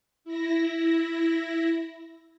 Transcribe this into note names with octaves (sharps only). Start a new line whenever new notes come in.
E4 A#6